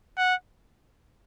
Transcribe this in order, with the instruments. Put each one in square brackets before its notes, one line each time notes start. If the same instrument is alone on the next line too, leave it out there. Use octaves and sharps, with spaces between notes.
[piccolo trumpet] F#5